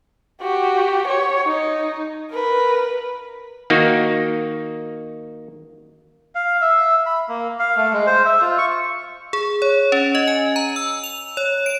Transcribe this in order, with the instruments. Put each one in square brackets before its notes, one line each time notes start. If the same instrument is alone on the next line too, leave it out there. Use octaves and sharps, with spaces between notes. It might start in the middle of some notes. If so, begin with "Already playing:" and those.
[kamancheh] F#4 G4
C#5
D#4
A#4 B4
[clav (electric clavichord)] D#3 A#3 D#4 F#4
[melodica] F5
E5
B5
A#3
F5
A3
G#3
C5
E5
F4
C#6
[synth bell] G#4
C#5
C#4
D#5
G#5
A#5
E6
F7
C#5
D7